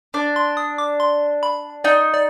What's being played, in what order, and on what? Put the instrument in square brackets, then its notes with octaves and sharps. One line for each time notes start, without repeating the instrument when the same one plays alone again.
[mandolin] D4 [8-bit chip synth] D6
[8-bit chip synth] C6
D#6
D6
C6
B5
[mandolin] D#4 [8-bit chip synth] D5
[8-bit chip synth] D5